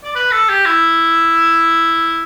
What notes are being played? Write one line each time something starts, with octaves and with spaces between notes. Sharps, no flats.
D5
B4
A4
G4
E4